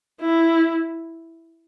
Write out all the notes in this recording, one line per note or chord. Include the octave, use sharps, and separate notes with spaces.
E4